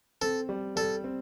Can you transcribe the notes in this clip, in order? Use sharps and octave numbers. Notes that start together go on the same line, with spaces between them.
C4 A4
G3
G3 A4
C4